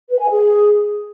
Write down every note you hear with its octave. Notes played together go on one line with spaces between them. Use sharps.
B4
G#5
G#4